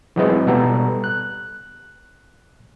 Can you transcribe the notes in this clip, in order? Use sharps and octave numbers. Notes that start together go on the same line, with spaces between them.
E3 F#3 G#3 C4 B4 D#5
B2 G3 B3 A4 A#5
F#6